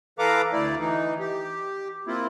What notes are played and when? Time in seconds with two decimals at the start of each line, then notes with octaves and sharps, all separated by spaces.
0.19 E3 A4 B4 F5 A#5 D6
0.53 D2 A3 E4 D5
0.80 E3 D#4
1.19 G4
2.07 A#3 C4 E4 F4